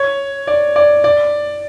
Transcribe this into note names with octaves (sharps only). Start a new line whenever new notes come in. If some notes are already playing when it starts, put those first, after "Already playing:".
Already playing: C#5
D5
D5
D5